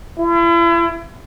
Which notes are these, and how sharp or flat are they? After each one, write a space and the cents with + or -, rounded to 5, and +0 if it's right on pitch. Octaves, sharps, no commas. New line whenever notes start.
E4 +40